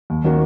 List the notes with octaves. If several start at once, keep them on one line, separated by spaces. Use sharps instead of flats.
D#2
D#3 A#3 C#4 F#4